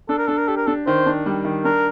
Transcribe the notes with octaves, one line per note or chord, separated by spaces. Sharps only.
D4 A4
A#4
D4 A4
A#4
G4 A4
A#4
D4 A4
D#3 C5
D4
G3
D#3
D4 A#4